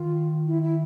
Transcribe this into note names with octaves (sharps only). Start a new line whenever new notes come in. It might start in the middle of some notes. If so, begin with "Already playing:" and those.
Already playing: D#3 F4
E4
E4